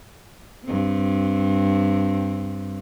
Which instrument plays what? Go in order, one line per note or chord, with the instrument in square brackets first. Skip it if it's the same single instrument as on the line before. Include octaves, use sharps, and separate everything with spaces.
[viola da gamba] G2 C4